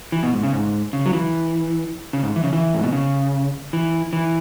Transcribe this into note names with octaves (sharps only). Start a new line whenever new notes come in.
E3
B2
G#2
C#3
G#2
C#3
F#3
E3
C#3
G#2
E3
C#3
E3
G#2
B2
C#3
E3
E3